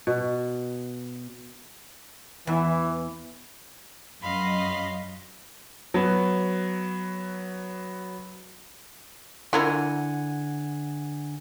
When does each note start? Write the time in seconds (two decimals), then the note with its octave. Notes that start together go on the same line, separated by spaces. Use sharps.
0.07 B2
2.47 E2 E3
4.23 F#2 D#5 F5 B5 C6
5.94 F#3 B3
9.53 D3 E4 F4 A#4 F#5 G#5